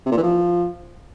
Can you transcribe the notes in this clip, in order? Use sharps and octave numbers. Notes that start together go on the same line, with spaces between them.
C3
A#2
E3
F3